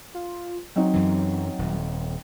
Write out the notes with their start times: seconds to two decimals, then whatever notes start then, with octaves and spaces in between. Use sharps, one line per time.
0.14 F4
0.76 F#3 C4 D#4
0.94 F#2 E3
1.59 D#1